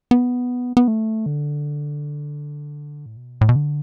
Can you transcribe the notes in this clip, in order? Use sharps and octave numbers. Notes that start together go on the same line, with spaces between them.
B3
B3
A3
D3
A2
B2
A2
B2
D3